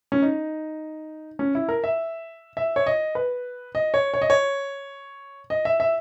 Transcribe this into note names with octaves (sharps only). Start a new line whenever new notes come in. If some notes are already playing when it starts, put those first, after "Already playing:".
C#4
D#4
C#4
E4
A#4
E5
E5
C#5
D#5
B4
D#5
C#5
C#5
D#5
C#5
D#5
E5
E5